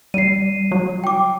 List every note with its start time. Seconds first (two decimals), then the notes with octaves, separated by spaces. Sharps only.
0.14 G3 C7 D#7
0.71 F#3
1.04 G5 D6